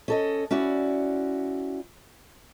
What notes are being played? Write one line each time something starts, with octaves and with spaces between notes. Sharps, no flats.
C#4 A4 D#5
C#4 E4 F#4 D5